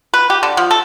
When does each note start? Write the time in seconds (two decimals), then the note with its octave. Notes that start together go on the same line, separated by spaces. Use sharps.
0.14 B4
0.30 G4
0.43 D3
0.57 F3
0.71 A4